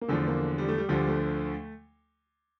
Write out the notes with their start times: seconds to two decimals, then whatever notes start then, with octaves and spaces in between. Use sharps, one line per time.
0.01 A#3
0.08 E2 D3 F3 A3
0.28 A#3
0.58 G3
0.68 A3
0.78 G3
0.88 D2 D3 F3 G3
1.08 A3